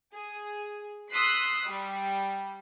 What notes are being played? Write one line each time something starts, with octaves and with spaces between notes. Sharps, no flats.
G#4
C6 D#6 E6 F#6 B6 C7
G3